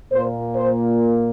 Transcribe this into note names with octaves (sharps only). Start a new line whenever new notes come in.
A#2 A#3 C5
C5